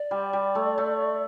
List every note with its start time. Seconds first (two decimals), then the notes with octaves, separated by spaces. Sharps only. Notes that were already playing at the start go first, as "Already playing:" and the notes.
Already playing: D5
0.11 G3
0.33 G3
0.55 A3
0.78 A3